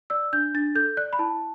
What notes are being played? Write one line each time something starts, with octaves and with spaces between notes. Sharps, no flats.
D5 E6
D4 G6
D4 A6
A4 G6
D5 F#6
B5
E4 A5